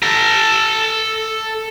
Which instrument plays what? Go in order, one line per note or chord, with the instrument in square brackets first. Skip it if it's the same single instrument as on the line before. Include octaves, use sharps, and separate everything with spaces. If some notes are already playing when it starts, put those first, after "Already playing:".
[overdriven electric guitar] A4 A#5